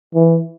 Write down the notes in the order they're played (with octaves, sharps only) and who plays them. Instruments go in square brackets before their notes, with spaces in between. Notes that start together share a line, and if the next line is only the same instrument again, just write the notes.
[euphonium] E3